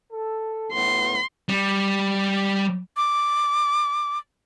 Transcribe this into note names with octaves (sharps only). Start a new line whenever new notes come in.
A4
A2 B3 C6
G3
D6